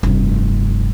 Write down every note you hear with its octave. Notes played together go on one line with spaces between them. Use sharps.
F1 G2